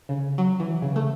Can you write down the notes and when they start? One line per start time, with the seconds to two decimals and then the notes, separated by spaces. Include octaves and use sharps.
0.09 C#3
0.38 F#3
0.60 E3
0.82 C#3
0.96 A3